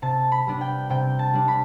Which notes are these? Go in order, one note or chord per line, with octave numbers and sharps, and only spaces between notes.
C3 A5
B5
G3 B3 D4
G5
C3 G5
A5
G3 D4
B5